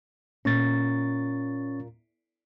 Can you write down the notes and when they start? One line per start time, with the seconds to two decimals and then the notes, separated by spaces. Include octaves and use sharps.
0.45 A#2 C#4 C#6 A6